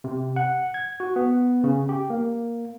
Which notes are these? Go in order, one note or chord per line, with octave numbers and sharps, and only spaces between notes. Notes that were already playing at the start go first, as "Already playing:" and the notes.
C3
F#5
G#6
F#4
B3
C#3
G4
A#3